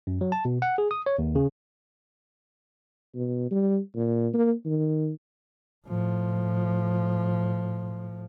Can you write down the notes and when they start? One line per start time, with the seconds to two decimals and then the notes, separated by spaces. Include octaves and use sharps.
0.07 F#2
0.21 F#3
0.32 A5
0.45 B2
0.62 F#5
0.78 G#4
0.91 D#6
1.06 C#5
1.19 D#2
1.35 C#3
3.15 B2
3.51 G3
3.95 A#2
4.34 A#3
4.66 D#3
5.87 A2 F3